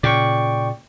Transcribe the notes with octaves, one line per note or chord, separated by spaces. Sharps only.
A#2 C#3 D5 G5 C#6